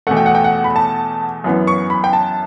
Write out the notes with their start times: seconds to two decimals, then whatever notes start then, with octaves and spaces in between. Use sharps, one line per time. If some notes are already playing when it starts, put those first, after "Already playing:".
0.07 E2 B2 A3 F#5
0.17 G5
0.26 F#5
0.35 G5
0.44 F#5
0.64 B5
0.76 A5
1.44 F#2 E3 B3
1.67 C#6
1.90 B5
2.04 G5
2.13 A5